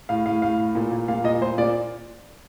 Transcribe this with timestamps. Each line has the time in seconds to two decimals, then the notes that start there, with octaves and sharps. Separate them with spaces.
0.09 A2 F5
0.26 A2 F5
0.42 A2 F5
0.58 A2
0.75 A#2
0.92 A#2
1.08 A#2 F5
1.24 A#2 D#5
1.41 A#2 C5
1.58 A#2 D5